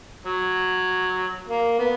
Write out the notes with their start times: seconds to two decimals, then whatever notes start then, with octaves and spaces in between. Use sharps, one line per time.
0.23 F#3
1.48 A#3
1.79 B3